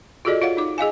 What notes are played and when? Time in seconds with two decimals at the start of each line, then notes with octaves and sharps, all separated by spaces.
0.25 F4 F#4 G#4 A4 D5 D#5
0.42 F4 C#5 F5 F#5
0.57 D#4 D6
0.78 G#4 D#5 F5 G#5